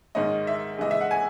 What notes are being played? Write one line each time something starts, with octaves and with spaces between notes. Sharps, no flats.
G#2 D#3 G#3 C#4 D#5
E5
C#3 E3 G#3 D#5
E5
F#5
G#5